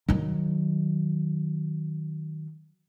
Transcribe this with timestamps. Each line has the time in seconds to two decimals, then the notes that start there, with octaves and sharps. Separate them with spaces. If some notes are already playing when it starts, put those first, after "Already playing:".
0.08 D#3 F#3